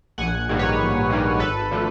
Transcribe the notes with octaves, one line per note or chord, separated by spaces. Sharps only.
A#1 F#5 G#5
G#2 D#3 G3 A#3
B4 C#5
A#1
G#2 D#3 G3 A#3
G#1 A4 B4
D3 F3 A3